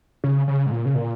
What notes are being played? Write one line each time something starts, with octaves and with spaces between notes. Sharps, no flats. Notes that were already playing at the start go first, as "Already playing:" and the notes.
C#3
C#3
G#2
A#2
C#3
A#2